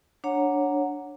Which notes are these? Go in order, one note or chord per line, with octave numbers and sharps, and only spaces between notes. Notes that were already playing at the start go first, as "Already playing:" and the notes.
D4 C#5 F#5 A#5